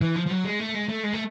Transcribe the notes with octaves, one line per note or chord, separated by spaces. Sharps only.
E3
F3
F3
F#3
G#3
A3
G#3
A3
G#3
A3